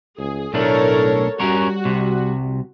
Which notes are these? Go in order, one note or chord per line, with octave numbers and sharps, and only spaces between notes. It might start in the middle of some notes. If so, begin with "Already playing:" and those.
C#2 G#4
B1 A2 A3 D4 A4 A#4 C#5
G3 C#4 F#4 A#4 C#5
C2 C3